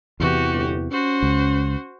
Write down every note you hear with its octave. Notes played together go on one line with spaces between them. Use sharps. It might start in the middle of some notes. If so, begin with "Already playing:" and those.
E2 C3 E3 F#4 G4
G1
C#4 F#4 C5
C#2